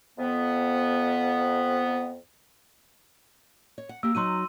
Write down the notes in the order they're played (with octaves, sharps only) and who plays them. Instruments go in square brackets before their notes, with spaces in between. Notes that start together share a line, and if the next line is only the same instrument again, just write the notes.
[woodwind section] F2 B3
[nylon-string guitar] C#5
F#5
[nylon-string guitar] A#3 G4 [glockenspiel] E6
[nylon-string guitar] F#3 D#4 F#4 [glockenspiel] C6 D#7